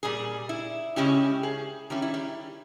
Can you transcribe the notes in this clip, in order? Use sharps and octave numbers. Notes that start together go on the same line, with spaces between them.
A#2 G3 G#4
E4
C#3 G#3 C#4 E4 G4
G#4
D#3 G3 C#4 E4 G4
E4
G4